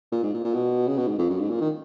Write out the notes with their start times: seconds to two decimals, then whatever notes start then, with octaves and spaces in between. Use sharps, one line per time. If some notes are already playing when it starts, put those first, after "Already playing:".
0.12 A#2
0.23 G#2
0.34 A#2
0.45 A#2
0.54 B2
0.87 C#3
0.97 B2
1.07 G#2
1.18 F2
1.30 F#2
1.40 G#2
1.50 A#2
1.61 D#3